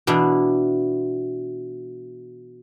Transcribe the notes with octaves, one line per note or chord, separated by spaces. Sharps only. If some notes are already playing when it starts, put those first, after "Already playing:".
B2 E3 D4 E4